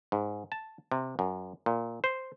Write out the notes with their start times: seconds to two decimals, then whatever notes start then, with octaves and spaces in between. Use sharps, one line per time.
0.12 G#2
0.52 A5
0.92 C3
1.19 F#2
1.66 A#2
2.04 C5